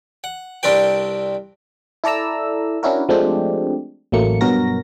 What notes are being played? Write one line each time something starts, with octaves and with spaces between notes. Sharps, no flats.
F#5
C2 C4 D4 A#4 B4 G5
E4 A4 D5 A#5 E6
C#4 D4 E4 F#4 A#4
F3 G#3 A3 C4 D4 G4
A1 F#3 A3 A#3 C#7
G2 B2 F#3 F#4 A#4 A#6